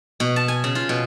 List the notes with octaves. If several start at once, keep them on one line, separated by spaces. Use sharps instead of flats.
B2
A5
G#5
C#3
F4
B2